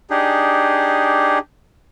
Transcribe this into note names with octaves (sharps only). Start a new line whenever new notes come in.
D4 D#4 G4 G#4